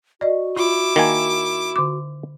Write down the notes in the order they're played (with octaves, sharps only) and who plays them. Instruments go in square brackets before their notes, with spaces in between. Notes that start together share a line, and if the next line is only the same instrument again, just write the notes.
[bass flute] F#4 [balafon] D5 D#5
[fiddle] E4 D6 [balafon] F4
[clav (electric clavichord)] D#3 A#3 G#5
[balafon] D3 D6